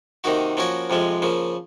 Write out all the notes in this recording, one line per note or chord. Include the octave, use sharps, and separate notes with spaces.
C3 D#3 A#3 D#4 F#4
F3 A#3 C#4 F#4 A#4
F2 C3 F3 G#3
C#3 F3 A#3